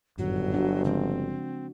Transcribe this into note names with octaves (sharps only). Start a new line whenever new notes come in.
G1 F#2 A2 D#3 F#3
D4 F#4
C#3 F3 G#3 C4